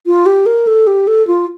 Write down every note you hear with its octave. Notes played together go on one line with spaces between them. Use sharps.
F4
G4
A#4
A4
G4
A4
F4